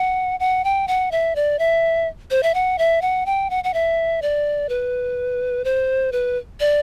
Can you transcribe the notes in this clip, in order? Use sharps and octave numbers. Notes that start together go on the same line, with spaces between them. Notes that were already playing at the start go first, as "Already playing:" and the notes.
Already playing: F#5
F#5
G5
F#5
E5
D5
E5
C5
E5
F#5
E5
F#5
G5
F#5
F#5
E5
D5
B4
C5
B4
D5